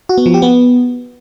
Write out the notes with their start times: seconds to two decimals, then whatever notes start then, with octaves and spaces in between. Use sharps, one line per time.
0.09 F#4
0.18 B3
0.26 F3
0.34 G4
0.42 B3